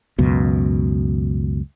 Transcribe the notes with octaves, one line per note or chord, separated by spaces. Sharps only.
C#2 F#2 B2